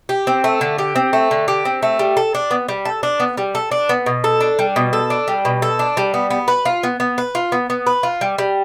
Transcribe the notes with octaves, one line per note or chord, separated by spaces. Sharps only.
G4
C4
A3
D3
G4
C4
A3
D3
G4
C4
A3
G3
A4
D4
B3
G3
A4
D4
B3
G3
A4
D4
B3
B2
A4
D4
G3
B2
A4
D4
G3
B2
A4
D4
G3
B3
B3
B4
F4
B3
B3
B4
F4
B3
B3
B4
F4
G3
G3